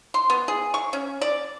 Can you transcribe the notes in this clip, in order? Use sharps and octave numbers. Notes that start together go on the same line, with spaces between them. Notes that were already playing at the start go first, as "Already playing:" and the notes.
C6
B3
G#4
C#6
C#4
D5